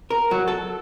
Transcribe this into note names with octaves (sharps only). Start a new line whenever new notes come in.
A#4
F#3
A4